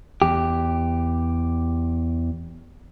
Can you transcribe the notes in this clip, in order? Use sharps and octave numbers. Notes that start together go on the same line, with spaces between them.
E2 G4